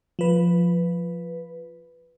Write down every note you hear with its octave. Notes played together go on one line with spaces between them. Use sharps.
F3 B4